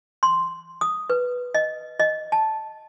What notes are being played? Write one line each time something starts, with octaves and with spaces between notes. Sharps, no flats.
C6
D#6
B4
D#5
D#5
A5